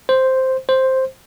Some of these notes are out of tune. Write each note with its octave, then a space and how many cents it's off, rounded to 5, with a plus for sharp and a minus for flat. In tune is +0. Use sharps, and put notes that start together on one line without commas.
C5 +0
C5 +5